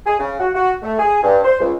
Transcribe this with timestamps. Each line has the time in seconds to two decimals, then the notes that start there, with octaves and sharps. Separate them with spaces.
0.06 G#4
0.19 C#3
0.40 F#4
0.54 F#4
0.82 A3
0.99 G#4
1.23 G2
1.44 C5
1.59 C#2